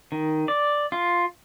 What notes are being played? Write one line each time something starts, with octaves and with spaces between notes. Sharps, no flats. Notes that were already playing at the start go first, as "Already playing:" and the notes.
D#3
D5
F4